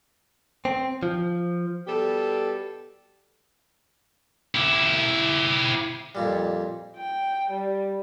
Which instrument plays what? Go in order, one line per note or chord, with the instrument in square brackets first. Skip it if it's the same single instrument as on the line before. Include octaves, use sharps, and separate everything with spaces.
[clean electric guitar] C4
F3
[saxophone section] B2 G3 G4 A4
[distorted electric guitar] E4 G4
[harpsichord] F2 A#2 G3
[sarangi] G5
G3